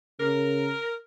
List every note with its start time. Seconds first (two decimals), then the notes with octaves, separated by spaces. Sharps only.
0.20 C#3 A#4